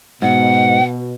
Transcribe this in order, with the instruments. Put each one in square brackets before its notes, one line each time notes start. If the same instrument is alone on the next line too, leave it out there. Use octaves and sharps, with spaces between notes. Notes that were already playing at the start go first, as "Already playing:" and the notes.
[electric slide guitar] G#2 [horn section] B2 [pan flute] F#5